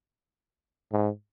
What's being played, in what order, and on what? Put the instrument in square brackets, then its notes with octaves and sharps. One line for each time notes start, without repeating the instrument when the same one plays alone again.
[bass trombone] G#2